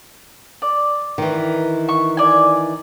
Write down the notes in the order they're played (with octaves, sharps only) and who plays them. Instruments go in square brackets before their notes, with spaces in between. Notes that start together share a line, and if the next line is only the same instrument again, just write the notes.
[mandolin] D5
[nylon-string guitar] D#3 E3
[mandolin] C#6
D5 G#5